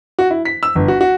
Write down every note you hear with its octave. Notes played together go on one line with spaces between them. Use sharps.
F#4
E4
B6
E6
G1
F#4
F#4